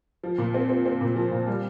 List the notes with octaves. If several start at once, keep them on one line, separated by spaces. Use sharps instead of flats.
F3
A#2
C4
C4
C4
A#2
F3
A#2
G3